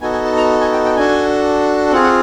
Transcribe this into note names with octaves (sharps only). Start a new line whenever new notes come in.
B3 D#4 F#4 A4 G#5
G#5
A5
A#5
G#5
G5
G5
D4 F#4 A4 G#5
C4 F4 G#4 F#5
F#5